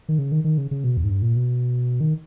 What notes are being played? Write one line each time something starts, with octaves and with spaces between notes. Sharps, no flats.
D#3
C#3
D#3
D#3
C#3
C#3
B2
E2
G#2
G2
A#2
B2
D#3